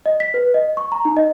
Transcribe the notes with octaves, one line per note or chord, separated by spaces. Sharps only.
D#5
B6
B4
D#5
C#6
A#5
D#4
D#5